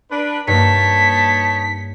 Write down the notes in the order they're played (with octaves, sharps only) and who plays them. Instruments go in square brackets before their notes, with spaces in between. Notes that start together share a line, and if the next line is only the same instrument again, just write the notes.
[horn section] D4 B4
[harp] G2 A#3 [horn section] D#4 C#5 A5 [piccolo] B6